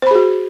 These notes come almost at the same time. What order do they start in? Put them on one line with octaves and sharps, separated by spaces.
C5 B5 G#4 F#4